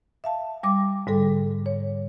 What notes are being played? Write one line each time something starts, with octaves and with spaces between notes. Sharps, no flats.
E5 F5 A5
G3 D6
G#2 D3 G3 A4
C#5